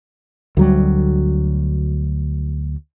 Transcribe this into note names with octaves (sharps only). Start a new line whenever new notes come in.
D2 F#3 G3